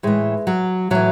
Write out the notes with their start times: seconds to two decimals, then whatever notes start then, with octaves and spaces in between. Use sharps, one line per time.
0.03 A2 E3 G#3
0.47 F#3
0.91 A2 E3 F#3